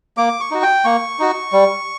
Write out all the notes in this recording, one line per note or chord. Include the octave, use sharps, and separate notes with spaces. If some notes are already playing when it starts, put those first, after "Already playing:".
A#3 D6
C#6
D#4 F#4
G5
A#3 C#6
D#4 F#4
G3